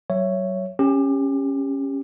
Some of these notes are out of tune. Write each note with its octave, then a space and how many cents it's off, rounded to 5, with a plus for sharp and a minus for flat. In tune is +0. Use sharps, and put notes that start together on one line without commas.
F#3 +35 C#5 +0 E5 +20
C#4 -10 G4 +25